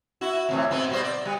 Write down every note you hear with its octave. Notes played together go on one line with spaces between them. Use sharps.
E4 F#4
F2 A2 E3
G#2 B3 C4
B2 G3 C5
D5
G3